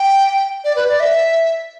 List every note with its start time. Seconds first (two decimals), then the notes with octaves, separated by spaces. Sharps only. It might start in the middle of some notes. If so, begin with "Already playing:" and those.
Already playing: G5
0.64 D5
0.76 B4
0.88 D5
1.00 E5